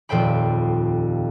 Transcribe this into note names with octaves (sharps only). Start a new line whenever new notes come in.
D#1 F2 A4 C5 G5 B5